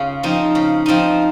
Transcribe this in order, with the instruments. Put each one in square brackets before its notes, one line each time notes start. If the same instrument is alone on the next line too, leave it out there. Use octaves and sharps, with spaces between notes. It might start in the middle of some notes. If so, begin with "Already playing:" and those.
Already playing: [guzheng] C#3 F4 G#4
F3 C4 D#4
C#3
F3 C4 D#4